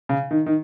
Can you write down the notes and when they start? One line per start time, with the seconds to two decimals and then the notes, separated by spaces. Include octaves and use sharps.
0.09 C#3
0.31 D#3
0.46 D#3